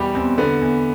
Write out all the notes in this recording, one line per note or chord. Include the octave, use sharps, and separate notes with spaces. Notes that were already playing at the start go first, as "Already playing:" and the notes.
Already playing: E2 B2 G3 G4
E2 C4
D3 B3
E2